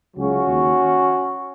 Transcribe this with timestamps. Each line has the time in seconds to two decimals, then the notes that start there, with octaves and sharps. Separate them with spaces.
0.16 C#2 C#3 F#3 C#4 F#4
0.48 D#2